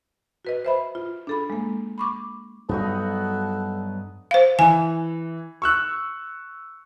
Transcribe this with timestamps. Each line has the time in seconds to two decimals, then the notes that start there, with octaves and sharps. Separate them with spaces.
0.45 F#4 B4 D#5
0.65 C5 E5 B5
0.95 F4
1.27 D4 A4 B5
1.50 G#3 A#3
1.98 B5 C#6 D6
2.69 G2 F#3 B3 D#4 F#4 A4
4.31 C5 F5
4.59 E3 G#5
5.62 C#6 E6 F#6